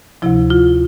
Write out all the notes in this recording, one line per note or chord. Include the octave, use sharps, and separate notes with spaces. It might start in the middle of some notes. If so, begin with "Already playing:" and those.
D2 C3 F3 E4
F4